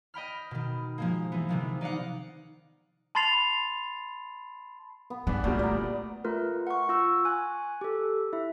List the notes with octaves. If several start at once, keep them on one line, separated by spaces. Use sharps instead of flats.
D#5 G5 B5 F6
B2 D#3
F3 G#3 A#3
E3 B3
C3 D#3 F3
D#4 D5 F5 F#5
A5 B5 C6 A6 C7 F7
B3
G3 B3 D4 G#4
D2 A#2 G3 A3 D5
D5 A#5
A3 F4 A#4 B4
F#5 C#6
F4 C#6 E6
G#5 F#6
G4 A4
E4 E5